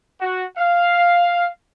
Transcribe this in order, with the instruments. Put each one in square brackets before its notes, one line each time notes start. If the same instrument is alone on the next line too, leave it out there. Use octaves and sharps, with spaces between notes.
[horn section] F#4
F5